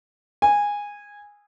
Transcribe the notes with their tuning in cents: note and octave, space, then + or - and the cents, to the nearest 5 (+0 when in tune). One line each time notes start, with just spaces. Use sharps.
G#5 -15